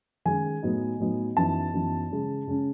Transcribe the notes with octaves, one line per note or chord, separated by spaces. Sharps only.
D#3 G#3 C#4 G#5
A2 F#3 B3 D#4
A2 F#3 B3 D#4
F#2 E3 B3 D#4 A5
F#2 E3 B3 D#4
C#3 G#3 C#4
C#3 G#3 C#4